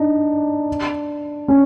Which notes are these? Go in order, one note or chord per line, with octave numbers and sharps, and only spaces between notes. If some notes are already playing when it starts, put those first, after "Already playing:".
Already playing: D4 D#4
C#4